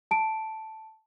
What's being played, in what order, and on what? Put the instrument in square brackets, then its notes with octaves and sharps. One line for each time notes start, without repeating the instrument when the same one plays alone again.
[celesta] A5 D7